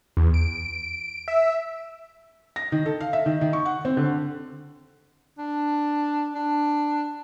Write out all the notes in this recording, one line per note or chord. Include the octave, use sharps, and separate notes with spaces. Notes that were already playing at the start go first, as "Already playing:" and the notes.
E2
D7
E5
A#6
D#3
A4
F5
E5
D#3
D#3
C#6
F#5
C4
D3
D4
D4